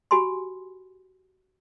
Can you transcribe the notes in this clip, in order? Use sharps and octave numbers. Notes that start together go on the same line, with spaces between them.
F#4 G4 G#5 B5 C6